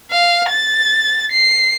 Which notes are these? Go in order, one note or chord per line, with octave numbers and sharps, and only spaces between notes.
F5
A6
C7